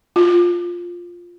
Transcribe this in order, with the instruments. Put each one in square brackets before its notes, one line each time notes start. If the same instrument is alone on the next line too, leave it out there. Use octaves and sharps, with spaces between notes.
[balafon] F4